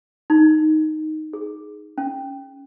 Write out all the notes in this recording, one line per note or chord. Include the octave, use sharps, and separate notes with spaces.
D#4
G#4
C#4